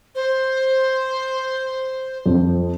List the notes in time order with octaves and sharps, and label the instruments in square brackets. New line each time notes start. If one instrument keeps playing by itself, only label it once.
[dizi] C5
[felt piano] F2